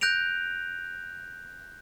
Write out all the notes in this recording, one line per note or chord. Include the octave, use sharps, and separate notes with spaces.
F#6 G6 A#6 D7 F7